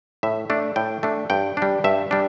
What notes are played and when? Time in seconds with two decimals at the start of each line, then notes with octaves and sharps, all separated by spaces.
0.23 A2 E5
0.50 A3 D4
0.76 A2 G5
1.03 A3 D4
1.30 G2 G5
1.57 G3 D4
1.84 G2 E5
2.11 G3 D4